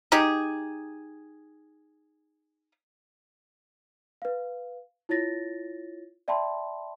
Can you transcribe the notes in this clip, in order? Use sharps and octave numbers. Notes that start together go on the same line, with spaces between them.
D#4 G4 G#4
B4 F5
E4 F4 C#5 A6 A#6
D5 E5 G5 A5 B5 C6